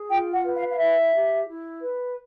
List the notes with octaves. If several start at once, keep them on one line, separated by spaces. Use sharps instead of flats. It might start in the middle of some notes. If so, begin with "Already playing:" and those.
Already playing: G#4
F4 G5
F#5
B4
F5
F5
E4 E5
G4
E4
B4